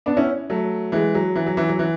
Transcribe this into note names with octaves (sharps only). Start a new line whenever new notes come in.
B3 D4
C#4 E4
F#3 A3
E3 G#3
F#3
E3
F#3
E3
F#3
E3